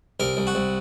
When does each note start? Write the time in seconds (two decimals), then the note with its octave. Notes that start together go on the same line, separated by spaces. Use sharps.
0.20 C2 A#4
0.37 C2
0.47 F#4
0.55 C2